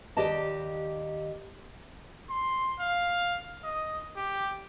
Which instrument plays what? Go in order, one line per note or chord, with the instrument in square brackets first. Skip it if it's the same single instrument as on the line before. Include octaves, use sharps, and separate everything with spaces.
[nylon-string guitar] D#2 G4 D5 D#5 A5
[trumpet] C6
F5
D#5
G4